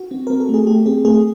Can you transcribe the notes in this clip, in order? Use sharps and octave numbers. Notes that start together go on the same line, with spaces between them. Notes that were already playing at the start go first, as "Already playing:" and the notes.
Already playing: F#4
C4
C4 A#4
A4
A3 G#4
A3 G4
C4 G#4
A3 G#4